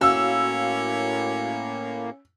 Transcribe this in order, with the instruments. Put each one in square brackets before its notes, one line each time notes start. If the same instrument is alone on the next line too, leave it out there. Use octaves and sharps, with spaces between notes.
[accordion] A2 A#3 [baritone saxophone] C#4 [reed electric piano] F#4 F5 [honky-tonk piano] E6